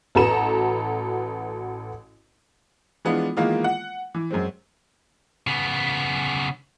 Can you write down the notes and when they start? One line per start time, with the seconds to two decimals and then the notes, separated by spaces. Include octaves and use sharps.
0.15 A1 F#4 A4 B4 A#5 E7
3.05 E3 F3 G#3 B3 D4 F4
3.37 D#3 E3 G#3 A#3 B3 F4
3.64 F#5
4.14 E3
4.31 F#2 G#3 C4
5.47 C#3 B3